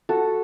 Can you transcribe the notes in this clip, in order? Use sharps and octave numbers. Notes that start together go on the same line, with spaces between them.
F#4 A4